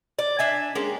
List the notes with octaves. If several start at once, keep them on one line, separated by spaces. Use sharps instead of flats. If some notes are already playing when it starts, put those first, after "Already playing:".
D5
D4 E5 G#5
G#3 A#3 C#4 G4